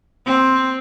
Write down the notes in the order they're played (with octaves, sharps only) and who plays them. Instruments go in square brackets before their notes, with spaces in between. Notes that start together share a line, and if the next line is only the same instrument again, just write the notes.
[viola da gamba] C4